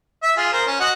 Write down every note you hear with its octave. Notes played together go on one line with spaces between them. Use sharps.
E5
F4 G#4
A#4 C5
C#4
F#4 D#5 F#5